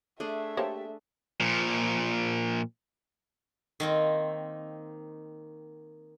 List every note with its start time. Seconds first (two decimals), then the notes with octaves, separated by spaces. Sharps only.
0.20 A3 D4 G#4 E5
0.57 A#3 G4 A4 C5 C#5
1.41 A#2 F3
3.80 D#3 A#3 C4